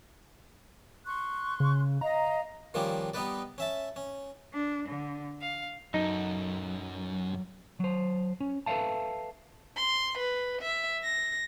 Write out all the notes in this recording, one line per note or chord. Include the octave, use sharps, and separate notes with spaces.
C6 C#6 F#6
C#3
D#5 F5 A#5
D#3 F3 G3 A#3 C#4 D4
G3 B3 D#4 B4 D5
C#4 E5 A5
C#4
D4
D3
F5
F#2 F#3 D#4 A4
F#3 C5
C#4
A4 B4 C#5 E5 F5 A5
C6
B4
E5
A#6